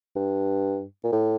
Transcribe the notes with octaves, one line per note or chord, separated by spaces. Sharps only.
G2
A#2
A2